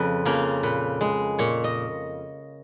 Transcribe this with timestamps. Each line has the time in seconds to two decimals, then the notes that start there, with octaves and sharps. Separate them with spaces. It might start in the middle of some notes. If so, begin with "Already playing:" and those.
Already playing: F2 C#3 F3 B4
0.25 C#3 F3 A#3
0.63 A#2 B4
1.01 G#3
1.39 A#2 C#5
1.64 D#5